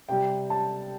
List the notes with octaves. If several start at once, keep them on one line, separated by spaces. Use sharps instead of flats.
C3 G3 G5
A5